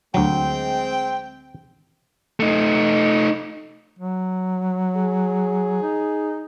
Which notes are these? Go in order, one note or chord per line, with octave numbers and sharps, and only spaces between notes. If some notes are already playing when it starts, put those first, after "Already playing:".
D2 F#3 G#3 C4 G5
A3 D#4
F#3
G#4
D#4